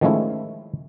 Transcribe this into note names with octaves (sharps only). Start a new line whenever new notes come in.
D#3 F3 G#3 A3 C#4 E4